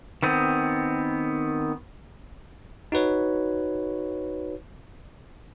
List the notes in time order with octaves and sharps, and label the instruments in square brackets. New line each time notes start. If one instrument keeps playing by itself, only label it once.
[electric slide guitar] D#3 B3 C4
[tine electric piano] D#4 F#4 B4 C#5